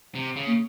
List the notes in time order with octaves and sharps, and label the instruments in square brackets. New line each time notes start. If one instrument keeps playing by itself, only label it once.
[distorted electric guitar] C3
C#3
[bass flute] A#3